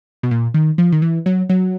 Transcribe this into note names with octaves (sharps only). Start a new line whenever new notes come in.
B2
A#2
D#3
F3
D#3
E3
F#3
F#3